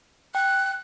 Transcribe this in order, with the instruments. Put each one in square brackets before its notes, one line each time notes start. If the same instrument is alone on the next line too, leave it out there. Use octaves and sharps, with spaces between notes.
[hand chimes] G5 [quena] F#6